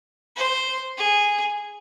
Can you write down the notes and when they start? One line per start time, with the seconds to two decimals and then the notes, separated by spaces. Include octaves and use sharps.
0.36 C5
0.97 G#4